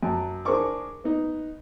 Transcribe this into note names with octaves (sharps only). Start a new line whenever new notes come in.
F#2 A5
D4 G#4 A#4 C5 C#6 D6
B3 D#4